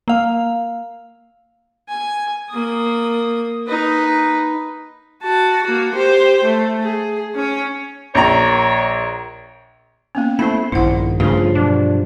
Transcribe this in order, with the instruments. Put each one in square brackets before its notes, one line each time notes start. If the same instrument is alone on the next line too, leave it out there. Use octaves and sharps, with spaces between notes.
[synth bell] A#3 F5
[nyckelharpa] G#5
A#3 D#6
D#4 B4
[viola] F#4 A5
A#3 F#4
G4 C5
A3
G#4
C#4 C#5
[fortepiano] A#1 A#5 [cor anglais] C#5
[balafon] A#3 B3 C#4
[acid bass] A3 [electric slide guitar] E4 C5 [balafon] B5
[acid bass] A#1 [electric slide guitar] G2 D#3 [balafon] E4 C5 F#5
[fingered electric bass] G2 F3 [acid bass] C#3 [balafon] A3 G#4 [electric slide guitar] F4
[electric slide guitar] B2 F#3 [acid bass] D4